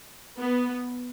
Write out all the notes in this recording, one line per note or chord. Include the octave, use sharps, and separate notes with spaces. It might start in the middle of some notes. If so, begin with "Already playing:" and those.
B3